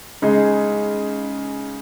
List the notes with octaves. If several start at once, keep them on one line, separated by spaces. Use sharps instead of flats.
C#3 G#3 D#4 G#4